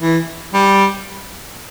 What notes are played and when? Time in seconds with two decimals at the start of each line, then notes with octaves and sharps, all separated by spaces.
0.01 E3
0.53 G3